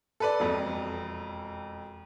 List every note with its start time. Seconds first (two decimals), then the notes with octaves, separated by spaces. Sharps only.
0.20 A4 B4 D5
0.40 E1 F2